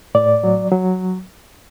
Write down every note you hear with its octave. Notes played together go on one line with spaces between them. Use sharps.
A2 D5
F#3
F#3